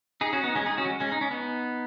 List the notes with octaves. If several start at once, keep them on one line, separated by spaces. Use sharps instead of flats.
D#4 G#4
C#4 F#4
B3 D#4
G#3 C#4
D#4 G#4
C#4 F#4
F#3
G#3
G#3 C#4
D#4
C#4
B3 D#4